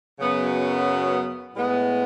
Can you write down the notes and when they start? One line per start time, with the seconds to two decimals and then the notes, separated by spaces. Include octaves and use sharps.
0.20 F#2 C#3 F#3 B3
1.55 A2 G#3 B3